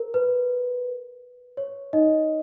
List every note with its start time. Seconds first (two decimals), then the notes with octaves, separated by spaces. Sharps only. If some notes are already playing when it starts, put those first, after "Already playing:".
Already playing: A#4
0.14 B4
1.57 C#5
1.93 D#4 D#5